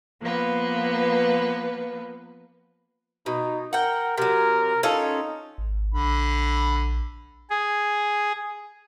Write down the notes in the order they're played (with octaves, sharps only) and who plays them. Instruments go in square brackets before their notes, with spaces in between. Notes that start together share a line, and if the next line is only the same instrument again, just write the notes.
[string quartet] F3 A#3 B3 B4
[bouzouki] B2 [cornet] D#4
[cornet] A#4 [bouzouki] F#5 G5
[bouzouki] C3 F#3 [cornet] A#4
[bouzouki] C#4 F4 A4 [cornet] D#4
[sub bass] G#1
[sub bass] A#1 [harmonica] D3 B5
[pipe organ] G#4